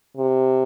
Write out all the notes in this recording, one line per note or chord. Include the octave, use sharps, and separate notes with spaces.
C3